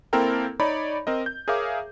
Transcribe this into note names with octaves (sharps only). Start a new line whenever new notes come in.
A#3 C4 E4 A4 A#4 G5
D#4 C#5 D5 A#5 B5
C4 A#4 D#5
G6
G#4 A#4 C#5 E5 F5 D6